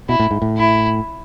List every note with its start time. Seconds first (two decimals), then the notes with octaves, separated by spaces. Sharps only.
0.09 B2 E4
0.20 A2
0.31 G#2
0.42 A2
0.57 E4